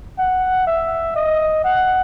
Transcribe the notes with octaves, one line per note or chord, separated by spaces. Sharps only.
F#5
E5
D#5
F#5